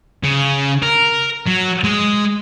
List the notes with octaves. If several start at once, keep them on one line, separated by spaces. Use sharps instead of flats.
C#3
A#4
F#3
G#3